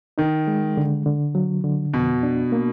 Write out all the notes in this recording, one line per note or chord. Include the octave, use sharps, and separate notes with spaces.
D#3 D#4
G#3
D3
D3
F#3
D3
F2 B2
D4
A#3